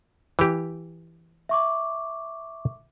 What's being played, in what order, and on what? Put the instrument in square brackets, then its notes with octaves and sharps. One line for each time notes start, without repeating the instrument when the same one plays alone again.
[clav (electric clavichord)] E3 G4
[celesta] E5 C#6 D6